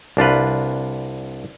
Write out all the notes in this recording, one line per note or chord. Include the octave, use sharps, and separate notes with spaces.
C2 D4 F4 B4